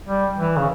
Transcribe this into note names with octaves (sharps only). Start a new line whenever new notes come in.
G3
E3
C#3